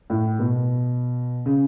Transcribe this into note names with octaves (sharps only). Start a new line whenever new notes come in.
A2
B2
C#3